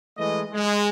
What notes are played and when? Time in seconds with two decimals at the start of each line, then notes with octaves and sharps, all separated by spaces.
0.17 E3 G#3 A3 D#5
0.53 G#3